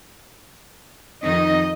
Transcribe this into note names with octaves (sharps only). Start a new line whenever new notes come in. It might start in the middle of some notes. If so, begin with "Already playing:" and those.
F2 D#3 D#4 D#5